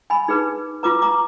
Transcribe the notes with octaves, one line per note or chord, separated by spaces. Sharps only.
G#5 B5
D#4 G#4 B4
F4 B4 A#5 D6
A#5 D6